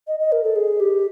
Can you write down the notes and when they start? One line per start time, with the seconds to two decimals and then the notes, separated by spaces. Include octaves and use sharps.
0.08 D#5
0.20 D#5
0.32 A#4
0.44 A4
0.56 G#4
0.80 G4